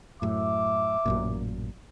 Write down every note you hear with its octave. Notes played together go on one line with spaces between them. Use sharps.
F#2 A2 E5 D6
A1 F#2 A#2